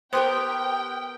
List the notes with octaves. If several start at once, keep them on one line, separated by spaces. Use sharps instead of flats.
B3 G4 A#4 C5 G5 C6